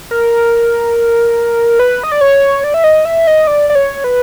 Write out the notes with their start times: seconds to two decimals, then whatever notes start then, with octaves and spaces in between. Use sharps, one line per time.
0.11 A#4
1.79 B4
2.03 D#5
2.12 D5
2.21 C#5
2.64 D5
2.74 E5
2.84 D#5
3.05 E5
3.27 D#5
3.47 D5
3.70 D5
3.75 C#5
4.04 B4